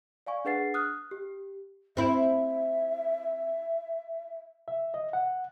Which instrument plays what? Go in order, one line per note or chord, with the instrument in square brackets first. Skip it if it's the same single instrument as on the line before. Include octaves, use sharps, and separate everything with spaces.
[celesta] D5 F5 G#5 C#6
D4 G#4 B4 F#5 A6 C7
D#6 F6 F#6
G4
[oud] C4 E4 [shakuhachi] E5
[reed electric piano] E5
D#5
F#5